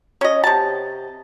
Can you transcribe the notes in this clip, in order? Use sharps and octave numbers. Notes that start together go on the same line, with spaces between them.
C#4 D#5
C3 A5